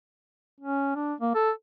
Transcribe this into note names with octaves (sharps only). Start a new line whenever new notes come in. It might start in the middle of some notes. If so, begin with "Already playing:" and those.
C#4
D4
A#3
A4